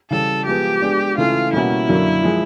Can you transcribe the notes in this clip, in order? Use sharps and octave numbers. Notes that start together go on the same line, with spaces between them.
C#3 E3 G3 A4
F3 G#3 B3 G4
G#3 B3 D4
C#3 E3 A3 C#4 F4
B2 G3 A#3 C#4 E4 F#4
F#2 D3 F#3 A#3
F3 G#3